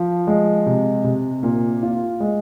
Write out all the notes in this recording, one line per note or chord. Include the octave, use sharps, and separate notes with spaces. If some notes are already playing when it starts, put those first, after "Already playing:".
Already playing: F3
G#3
C3
C3
A#2
F4
G#3